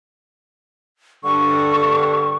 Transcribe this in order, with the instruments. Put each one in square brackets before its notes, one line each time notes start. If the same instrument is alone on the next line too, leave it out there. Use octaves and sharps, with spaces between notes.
[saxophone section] G2 D3 [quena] C#6